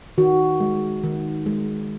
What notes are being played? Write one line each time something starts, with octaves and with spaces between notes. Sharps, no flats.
D#3 F#4
G#3
D#3
G#3